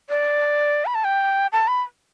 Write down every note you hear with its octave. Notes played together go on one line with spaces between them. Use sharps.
D5
B5
A5
G5
A5
B5